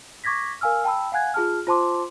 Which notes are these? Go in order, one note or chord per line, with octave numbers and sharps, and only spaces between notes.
C#6 D6 G#6 A#6 B6
A#4 F5 G#5 E6 F6
G5 A5 B5 E6
F5 F#5 G#5 F#6 G#6
F4 G#4 A5 F6
F4 C5 A5 C6 D6